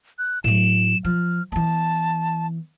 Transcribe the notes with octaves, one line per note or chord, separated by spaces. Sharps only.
F#6
A2 F#3 E7
F3 F6
E3 B3 A5